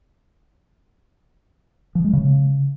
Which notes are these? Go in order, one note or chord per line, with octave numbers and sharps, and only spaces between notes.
F3
G#3
C#3